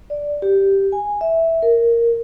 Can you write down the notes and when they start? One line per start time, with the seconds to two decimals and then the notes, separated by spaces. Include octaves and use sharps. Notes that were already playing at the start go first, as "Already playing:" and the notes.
0.10 D5
0.42 G4
0.92 G#5
1.21 E5
1.63 A#4